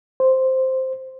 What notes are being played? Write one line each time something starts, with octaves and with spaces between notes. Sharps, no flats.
C5